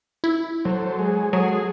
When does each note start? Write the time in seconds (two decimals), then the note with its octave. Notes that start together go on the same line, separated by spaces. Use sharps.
0.24 E4
0.65 F#3 A4 C5
0.99 G#3 G#4
1.33 F#3 G#3 F#4 G#4 A4